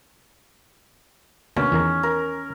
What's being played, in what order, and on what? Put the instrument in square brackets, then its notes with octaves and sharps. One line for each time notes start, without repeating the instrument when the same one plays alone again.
[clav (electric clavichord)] D2 B2 A#3 [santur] C#4
[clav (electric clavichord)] E2 D#3 A#5
[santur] A#4